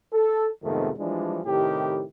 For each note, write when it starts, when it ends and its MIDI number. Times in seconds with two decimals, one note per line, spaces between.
0.13 0.49 69
0.64 0.92 41
0.64 0.92 44
0.64 0.92 48
0.64 0.92 51
0.64 0.92 57
0.64 0.92 59
0.99 1.38 52
0.99 1.38 53
0.99 1.38 55
0.99 1.38 56
0.99 1.38 62
1.44 2.04 45
1.44 2.04 48
1.44 2.04 51
1.44 2.04 64
1.44 2.04 67